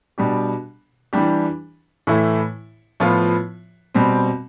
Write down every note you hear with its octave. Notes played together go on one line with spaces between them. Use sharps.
B2 G3 D4 G4
E3 G3 D4 G4
A2 E3 A3 E4
A2 F3 B3 F4
B2 G3 C4